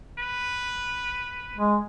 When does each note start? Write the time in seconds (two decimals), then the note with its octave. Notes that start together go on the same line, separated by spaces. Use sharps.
0.19 B4
1.57 G#3